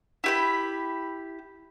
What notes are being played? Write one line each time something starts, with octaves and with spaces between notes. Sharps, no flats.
E4 G4 B5